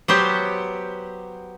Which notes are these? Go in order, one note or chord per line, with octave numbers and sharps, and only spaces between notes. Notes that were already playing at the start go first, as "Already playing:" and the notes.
F#3 B3 G4 C5